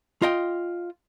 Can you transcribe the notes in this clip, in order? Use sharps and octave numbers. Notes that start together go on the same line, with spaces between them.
F4 D#5 G5